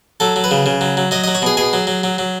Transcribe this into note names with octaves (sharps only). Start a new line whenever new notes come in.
F#3 A4
F#3
B4
C#3
C#3
F#3
F#3
F#3 D#5
F#3 D#5
C#5
B2 G#4
B2 G#4
F#3
F#3
F#3
F#3